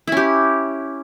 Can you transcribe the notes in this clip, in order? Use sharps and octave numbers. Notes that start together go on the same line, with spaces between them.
C#4 E4 G4